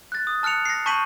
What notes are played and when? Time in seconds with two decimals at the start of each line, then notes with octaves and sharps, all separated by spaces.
0.12 F#6 A6
0.27 D#6
0.43 A5 F6 F#6 C#7 F7
0.66 A#6 C7
0.86 A5 C#6 G6 B6 D#7 F#7